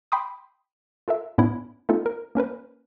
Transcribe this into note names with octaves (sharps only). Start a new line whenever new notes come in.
G5 B5 C6 D6 D#6
F4 A4 A#4 E5
A2 B3 C#4 D4 E4
A3 B3 C#4 D#4 F4 A4
A#4
A#3 C#4 A#4 B4